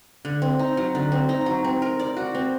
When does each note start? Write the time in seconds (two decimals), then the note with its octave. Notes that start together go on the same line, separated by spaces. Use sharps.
0.25 D3
0.42 C4
0.59 D#4
0.77 F#3
0.95 D3
1.12 C4
1.29 D#4
1.46 F#3
1.64 C4
1.82 A#4
2.00 D5
2.16 F#4
2.35 C4